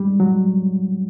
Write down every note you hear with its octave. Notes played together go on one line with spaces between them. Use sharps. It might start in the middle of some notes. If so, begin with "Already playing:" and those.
Already playing: G3 G#3
F#3